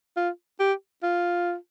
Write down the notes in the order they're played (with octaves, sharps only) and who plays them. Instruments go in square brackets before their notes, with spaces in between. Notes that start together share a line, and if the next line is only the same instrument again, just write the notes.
[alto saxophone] F4
G4
F4